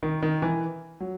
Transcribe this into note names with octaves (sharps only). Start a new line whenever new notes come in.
D#3
D#3
E3
F#3